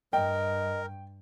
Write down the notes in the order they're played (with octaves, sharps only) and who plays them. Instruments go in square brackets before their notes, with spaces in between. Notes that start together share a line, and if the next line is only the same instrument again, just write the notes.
[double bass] G2 [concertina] A#4 [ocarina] D#5 [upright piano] G5